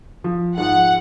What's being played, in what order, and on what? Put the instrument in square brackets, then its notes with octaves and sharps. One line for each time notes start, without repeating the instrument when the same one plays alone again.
[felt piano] F3
[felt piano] G#2 F3 [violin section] F#5